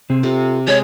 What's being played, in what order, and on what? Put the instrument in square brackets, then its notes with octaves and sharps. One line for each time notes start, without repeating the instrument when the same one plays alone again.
[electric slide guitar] C3 C4 G#4
[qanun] C3 [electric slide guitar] F4 A4
[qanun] G#3 [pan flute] C#5